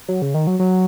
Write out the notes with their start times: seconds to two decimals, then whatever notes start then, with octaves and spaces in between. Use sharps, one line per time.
0.08 F#3
0.22 C#3
0.34 D#3
0.47 F#3
0.59 F#3